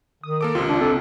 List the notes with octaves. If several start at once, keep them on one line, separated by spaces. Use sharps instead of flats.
D#3 D#6
A#3 A4 D6 D7
C#2 C3 F4
D4
C4 A4